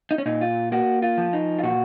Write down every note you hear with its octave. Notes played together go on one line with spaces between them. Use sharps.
D#4
C#4
A#2 D#4
F4
A#3 F#4
F4
F3
D#4
F4
A#2 F#4